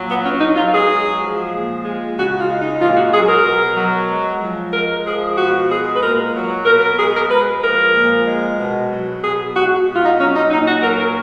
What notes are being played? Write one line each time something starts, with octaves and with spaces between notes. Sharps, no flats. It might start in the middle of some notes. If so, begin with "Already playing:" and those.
Already playing: A#2 F#3
B3
B2 C#4
D#4
F#3 F4
G#4
G#3
F3
A#2
G#3
C#3 F#4
F4
G#3
D#4
A#2 F4
F#4
F#3 G#4
A#4
B2
F#3
G#3
F3
G#3 A#4
F3 G#4
B2 F#4
G#3 G#4
B4
A#2 A#4
F#3
B2 A#4
A#4
G#3 G#4
A#4
G#3 B4
F3 A#4
A#2
G#3
B2
F#3
B2 G#4
G#3 F#4
B2
F4
D#4
F#3 C#4
D#4
A#2 D#4
F#4
F#3 A#4
A#4